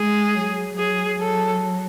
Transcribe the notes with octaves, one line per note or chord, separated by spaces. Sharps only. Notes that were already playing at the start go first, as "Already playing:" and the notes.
Already playing: G#3 G#4
F#3
F#3 G#4
F#3 A4